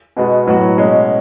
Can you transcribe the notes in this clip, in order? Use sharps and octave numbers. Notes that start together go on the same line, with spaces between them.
B2 G#3 B3 F#4
A2 F#3 B3 F#4
B2 G#3 C#4